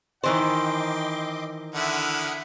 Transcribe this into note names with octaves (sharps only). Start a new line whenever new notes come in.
D#3 E3 C5 D#5 G5 C6 D6
D3 E4 F#5 D#6 F6